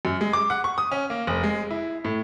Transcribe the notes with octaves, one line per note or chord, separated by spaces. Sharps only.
F#2
G#3
D6
F#5
C#6
D#6
C#4
A#3
F1
G#3
E4
A2